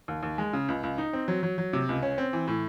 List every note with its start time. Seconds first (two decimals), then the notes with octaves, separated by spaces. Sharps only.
0.08 D#2
0.23 D#2
0.38 G#3
0.53 C#3
0.68 C#2
0.83 C#2
0.98 D#4
1.13 C4
1.28 F#3
1.43 F#3
1.58 F#3
1.73 C3
1.89 C#2
2.02 C#4
2.18 C4
2.33 E3
2.48 A2